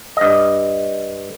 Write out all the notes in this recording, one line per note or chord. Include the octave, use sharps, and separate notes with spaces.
G2 D#5